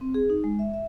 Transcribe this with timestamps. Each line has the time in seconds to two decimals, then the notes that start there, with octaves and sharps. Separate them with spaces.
0.01 C4
0.14 G#4
0.30 D#4
0.44 G#3
0.59 E5
0.74 E5